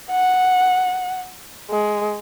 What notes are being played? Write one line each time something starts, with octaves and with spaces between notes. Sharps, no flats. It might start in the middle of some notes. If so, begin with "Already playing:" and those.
F#5
G#3